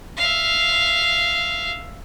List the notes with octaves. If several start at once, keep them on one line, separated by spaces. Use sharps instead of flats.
E5 F5